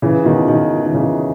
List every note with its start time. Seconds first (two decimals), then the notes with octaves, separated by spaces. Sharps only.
0.02 C#3 E3
0.25 B2 D#3
0.48 B2 D#3
0.85 D#3
0.93 C#3 E3